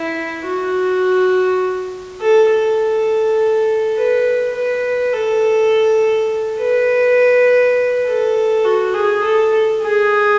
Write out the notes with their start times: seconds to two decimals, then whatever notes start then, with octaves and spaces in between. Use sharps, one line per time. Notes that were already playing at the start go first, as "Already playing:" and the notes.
Already playing: E4
0.45 F#4
2.21 A4
2.50 A4
3.96 B4
4.55 B4
5.13 A4
6.59 B4
8.06 A4
8.65 F#4
8.94 G#4
9.24 A4
9.82 G#4